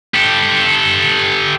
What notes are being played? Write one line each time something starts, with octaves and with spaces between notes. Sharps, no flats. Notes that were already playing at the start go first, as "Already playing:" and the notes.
G4 A4